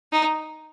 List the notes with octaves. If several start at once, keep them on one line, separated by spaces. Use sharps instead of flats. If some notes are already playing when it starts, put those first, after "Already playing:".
D#4